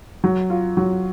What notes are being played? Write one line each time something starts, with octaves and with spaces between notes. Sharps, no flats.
F#3
F4
F#3